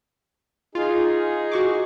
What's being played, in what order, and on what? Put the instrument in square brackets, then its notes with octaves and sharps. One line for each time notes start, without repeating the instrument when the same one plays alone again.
[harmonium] D#4 G#4 [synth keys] F4
[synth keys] F#4 C#6 D6